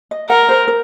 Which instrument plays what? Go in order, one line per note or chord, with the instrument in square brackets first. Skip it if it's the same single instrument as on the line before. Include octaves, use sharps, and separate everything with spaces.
[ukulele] D#5
[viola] A#4 [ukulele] F#5
[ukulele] C5
A#4